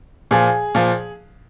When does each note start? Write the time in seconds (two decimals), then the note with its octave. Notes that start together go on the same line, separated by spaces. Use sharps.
0.31 A#2 F3 G#4
0.75 A#2 F3